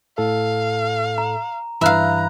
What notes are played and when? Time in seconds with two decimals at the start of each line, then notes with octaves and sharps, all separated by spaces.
0.18 A2 A4 F5
1.18 A#5
1.81 G2 E3 E5 F5 A#5 B5 F#6